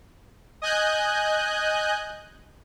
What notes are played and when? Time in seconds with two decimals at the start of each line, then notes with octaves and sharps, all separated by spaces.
0.62 D#5 G#5 F#6 G6